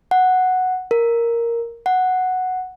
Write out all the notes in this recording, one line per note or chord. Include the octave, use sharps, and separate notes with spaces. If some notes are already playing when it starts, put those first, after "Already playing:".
F#5
A#4
F#5